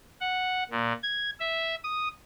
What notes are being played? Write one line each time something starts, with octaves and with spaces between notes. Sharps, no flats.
F#5
A#2
G#6
E5
D#6